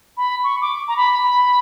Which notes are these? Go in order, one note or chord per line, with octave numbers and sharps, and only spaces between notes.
B5
C#6
D6
A#5
B5
B5